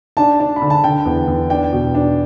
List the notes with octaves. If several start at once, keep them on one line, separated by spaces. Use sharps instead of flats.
D4 A5
D4
B5
D3
A5
D3 G5
E2
E2
D4 G5
B2
D4